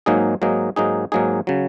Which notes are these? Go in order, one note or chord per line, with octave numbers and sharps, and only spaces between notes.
G#2 F#3 A#3 D#4 G#4
G#2 F#3 A#3 D#4 G#4
G#2 F#3 A#3 D#4 G#4
G#2 F#3 A#3 D#4 G#4
C#3 F#3